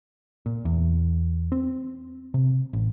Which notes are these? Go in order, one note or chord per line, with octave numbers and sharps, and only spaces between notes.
A#2
E2
C4
C3
A1